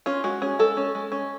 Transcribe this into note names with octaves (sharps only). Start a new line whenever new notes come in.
C#4 F4
G#3 F#4
C#4 G#4
G#3 A4
C#4
G#3
C#4